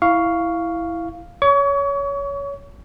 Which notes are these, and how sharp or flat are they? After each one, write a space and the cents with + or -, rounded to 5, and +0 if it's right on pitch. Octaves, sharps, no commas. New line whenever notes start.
E4 +0 F5 +0 C#6 +10
C#5 +20 C#6 +35